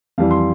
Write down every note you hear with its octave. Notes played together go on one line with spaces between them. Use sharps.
F2 E3 G3 F5
C6